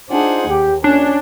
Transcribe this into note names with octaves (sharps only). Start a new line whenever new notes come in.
D4 D#4 F4 G#4 C5 F#5
D#2 G4
A#1 D#2 C#4 D4